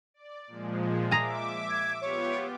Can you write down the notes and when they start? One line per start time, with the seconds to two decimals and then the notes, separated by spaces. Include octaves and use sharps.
0.14 D5
0.47 A#2 F3 G#3
1.11 G#4 E5 A#5 D6
1.70 G#6
2.02 B3 F4 G4 C#5